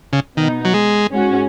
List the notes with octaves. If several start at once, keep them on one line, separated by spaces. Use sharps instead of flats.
C#3
B2 D#3 B3 D#4
F#3
G#3
G#2 G#3 C#4 F#4